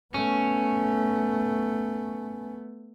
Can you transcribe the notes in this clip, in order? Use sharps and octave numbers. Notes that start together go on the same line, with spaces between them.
A3 B3 C#4